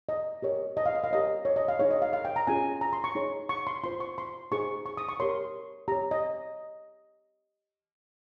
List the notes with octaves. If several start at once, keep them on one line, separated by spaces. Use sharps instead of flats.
D#5
G4 A#4 C#5
D#5
F5
D#5
F5
G4 A#4 C#5 D#5
C#5
D#5
F5
D#4 G#4 C#5
D#5
F5
F5
G5
A#5
C#4 F4 G#4 C#5 G#5
A#5
C6
C#6
D#4 G#4 C#5
C#6
C6
F4 C5 C6
C#6
C6
D#4 G#4 C5 C#6
C#6
D#6
C#6
G4 A#4 C#5 C6
G4 C#5 A#5
D#5